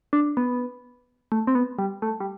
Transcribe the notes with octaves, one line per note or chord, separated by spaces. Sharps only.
D4
B3
A3
C4
B3
G3
A3
G3